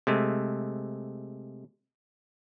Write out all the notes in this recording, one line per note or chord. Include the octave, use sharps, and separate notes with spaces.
C3 G#3 A3